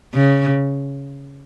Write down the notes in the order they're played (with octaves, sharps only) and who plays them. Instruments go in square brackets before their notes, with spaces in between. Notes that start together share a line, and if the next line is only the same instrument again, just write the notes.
[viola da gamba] C#3